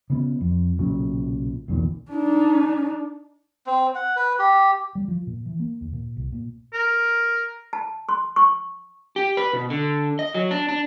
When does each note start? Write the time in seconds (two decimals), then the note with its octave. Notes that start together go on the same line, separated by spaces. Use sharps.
0.10 C#3 B3
0.41 F2
0.79 B1 A#2 C#3 F#3
1.68 B1 E2 A#2 D#3
2.12 D4 D#4
3.66 C4
3.95 F#5
4.16 B4
4.39 G4
4.95 G3
5.08 F3
5.27 A#2
5.46 E3
5.60 A#3
5.81 D#2
5.93 A#2
6.17 C2
6.32 A#2
6.74 A#4
7.73 A5
8.09 C6
8.36 C#6
9.16 G4
9.37 B4
9.53 B2
9.70 D3
10.19 D#5
10.34 F#3
10.51 D4
10.69 D4